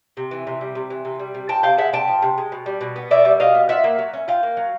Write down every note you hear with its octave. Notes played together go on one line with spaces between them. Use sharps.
C3
E3
C3
G3
C3
E3
C3
G3
C3
F3 G5 A5
C3 F5 G5
G#3 E5 F#5
C3 G5 A5
F3
C3
G#3
B2
G3
B2
B3
B2 D5 E5
G3
B2 D#5 F5
B3
F4 E5 F#5
A#3
F#3
C#4
F4 F5 G5
A#3
F#3